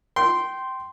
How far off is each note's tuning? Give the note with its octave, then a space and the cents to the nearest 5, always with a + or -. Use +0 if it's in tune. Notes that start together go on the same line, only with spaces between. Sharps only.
G5 -20 C6 +0